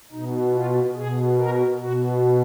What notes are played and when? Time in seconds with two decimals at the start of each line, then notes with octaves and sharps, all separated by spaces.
0.12 B2 D#4
0.54 F4
0.95 B2 G#4
1.38 A#4
1.80 B2 F#4